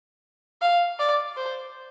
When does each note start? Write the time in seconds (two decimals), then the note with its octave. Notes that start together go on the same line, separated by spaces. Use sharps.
0.61 F5
0.99 D5
1.37 C5